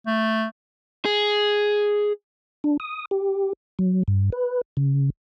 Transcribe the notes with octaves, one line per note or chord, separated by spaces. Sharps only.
A3
G#4
D4
D#6
G4
F#3
G2
B4
C#3